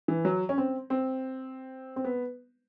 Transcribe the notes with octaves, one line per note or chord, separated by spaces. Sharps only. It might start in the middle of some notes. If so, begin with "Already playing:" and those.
E3
F#3
C#4
C4
C4
C4
B3